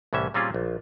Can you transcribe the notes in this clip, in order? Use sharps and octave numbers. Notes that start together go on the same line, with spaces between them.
C2 A2 E3 C#4 E5
A#2 G3 C4 C#4 F4 G#4
A#1